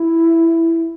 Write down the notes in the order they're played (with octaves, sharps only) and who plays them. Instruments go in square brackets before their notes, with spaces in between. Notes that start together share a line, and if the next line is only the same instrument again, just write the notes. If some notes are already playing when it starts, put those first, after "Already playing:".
Already playing: [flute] E4